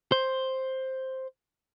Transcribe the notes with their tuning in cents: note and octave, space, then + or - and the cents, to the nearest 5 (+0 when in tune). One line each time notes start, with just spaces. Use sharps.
C5 +5